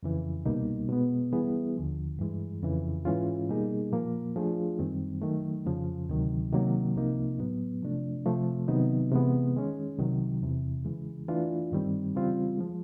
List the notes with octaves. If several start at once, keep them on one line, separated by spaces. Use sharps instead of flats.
F2 C#3 E3
C2 B2 G3 A#3 D#4
B2 G#3 B3
E3 G3 B3 E4 G#4
D#2 D3 F3
G2 E3 G#3
F2 C#3 E3
G#2 E3 G#3 C#4 F4
B2 G3 A#3 D#4 G#4
A#2 F3 A#3
F3 A3 D4 F4 G#4
F#2 D#3 G3 C4
D#3 F#3 A3
F2 C#3 F3
D2 C3 D#3 F#3
C3 D#3 F#3 A#3
C2 C3 F3 A#3 D#4
A2 F#3 B3
C3 F3 A3 D4
C3 F3 A3
C3 D#3 F#3 B3 D#4
C3 E3 G#3 B3
D#3 G#3 C#4
C2 C3 D#3 F#3
E2 C3 E3
C#3 E3 G#3
E3 A3 D4 F4
G2 D#3 G3 C4
C#3 E3 G3 C4 F4
F3 G#3